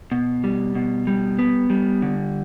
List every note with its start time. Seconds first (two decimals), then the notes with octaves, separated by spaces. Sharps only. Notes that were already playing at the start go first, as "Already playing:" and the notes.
0.12 B2
0.44 G3
0.75 B2
1.07 G3
1.39 B3
1.70 G3
2.02 D3